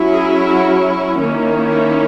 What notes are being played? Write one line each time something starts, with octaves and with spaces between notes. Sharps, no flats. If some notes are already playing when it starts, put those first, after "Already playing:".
Already playing: F#3 C#4 E4
G#4
F#4
D#3 A#3 C#4 E4